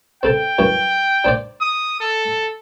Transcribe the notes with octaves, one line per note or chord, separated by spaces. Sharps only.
C4 A4 G5 A5
F#2 E3
D4 C5 D5
D#6
A4